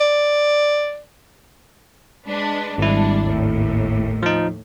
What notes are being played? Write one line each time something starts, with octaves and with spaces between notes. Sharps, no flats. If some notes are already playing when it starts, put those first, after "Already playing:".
D5
G#3 D4 B4
G#1 G3 G#3 D4 E4
D#2 A2
F3 D#4